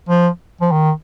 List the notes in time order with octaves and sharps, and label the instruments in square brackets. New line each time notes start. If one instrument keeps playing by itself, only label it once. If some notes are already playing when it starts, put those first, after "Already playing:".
[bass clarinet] F3
F3
D#3